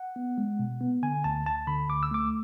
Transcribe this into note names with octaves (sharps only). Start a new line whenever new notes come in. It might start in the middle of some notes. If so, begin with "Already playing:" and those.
Already playing: F#5
B3
G#3
B2
B3
D3 G#5
D2 A5
D2 A5
D3 B5
D2 D6
E6
A3 D6